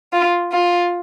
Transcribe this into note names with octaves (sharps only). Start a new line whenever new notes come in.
F4
F4